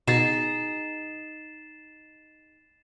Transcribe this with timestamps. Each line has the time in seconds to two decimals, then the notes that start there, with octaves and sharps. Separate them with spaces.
0.07 B2 D#4 G#4 A6 C7 E7